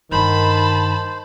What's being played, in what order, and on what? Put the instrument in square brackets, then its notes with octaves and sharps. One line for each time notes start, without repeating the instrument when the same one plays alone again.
[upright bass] G2 D3 [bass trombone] D#3 [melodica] C5 [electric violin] A5 B5